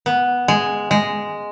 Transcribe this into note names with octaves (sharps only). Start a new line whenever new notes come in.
B3
G#3
G#3